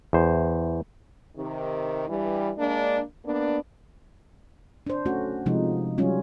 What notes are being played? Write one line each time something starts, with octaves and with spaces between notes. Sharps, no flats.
E2 C5
C3 D#3
G2 E3 G3
G#3 A#3 D4
A#3 B3 D4
D4 C5
A3 C#4 F#4
C3 F3 G#3 D#4
F#3 G3 C#4 F4